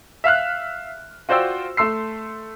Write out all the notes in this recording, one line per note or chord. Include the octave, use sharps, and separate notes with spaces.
E5 F5 F6 F#6
F4 F#4 C5 D5 G5 E6
A3 C6 E6 C7